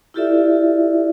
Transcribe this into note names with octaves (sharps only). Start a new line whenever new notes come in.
E4 F4 G4 A4 D5 E5